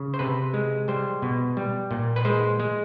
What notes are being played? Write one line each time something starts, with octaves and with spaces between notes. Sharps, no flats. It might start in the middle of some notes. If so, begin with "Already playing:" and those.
Already playing: C#3
C5
C3 B4
G#3
G3 C5
B2
G3
A#2
B4
G#3 C5
G#3